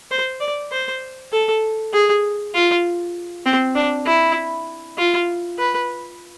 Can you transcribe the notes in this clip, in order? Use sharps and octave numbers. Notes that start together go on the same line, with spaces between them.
C5
D5
C5
A4
G#4
F4
C4
D4
E4
F4
B4